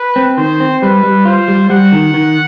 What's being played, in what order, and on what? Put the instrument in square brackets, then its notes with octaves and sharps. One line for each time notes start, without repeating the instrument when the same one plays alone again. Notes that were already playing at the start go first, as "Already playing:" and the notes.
Already playing: [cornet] B4
[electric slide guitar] C4
[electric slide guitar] D#3 [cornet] C5
[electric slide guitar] C4
[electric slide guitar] G3 [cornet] B4
[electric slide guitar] G3
[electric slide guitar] F4 [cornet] C5
[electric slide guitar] G3
[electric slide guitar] G3 [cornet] F#5
[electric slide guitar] D#3
D#3